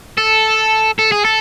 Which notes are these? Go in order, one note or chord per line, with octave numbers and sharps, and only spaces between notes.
A4
A4
G#4
A4